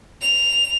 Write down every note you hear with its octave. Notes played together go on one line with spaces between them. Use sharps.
F7